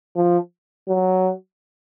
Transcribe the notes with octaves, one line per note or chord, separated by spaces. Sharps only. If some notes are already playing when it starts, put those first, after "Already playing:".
F3
F#3